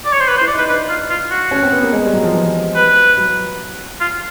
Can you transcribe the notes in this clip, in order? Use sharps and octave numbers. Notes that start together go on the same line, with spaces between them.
D5
C#5
C5
B4
C5
E4
D5
D#4 B4
D4 B4
F4
F4
F#4
C#4
C4
B3
A#3
G#3
G3
F#3
F3
E3
B4
F#3
F4